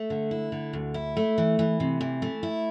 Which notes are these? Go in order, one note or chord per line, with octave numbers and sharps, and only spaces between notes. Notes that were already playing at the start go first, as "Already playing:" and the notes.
Already playing: A3
D3
E4
D3
D2
E4
A3
E3
E3
C3
E3
A3
E4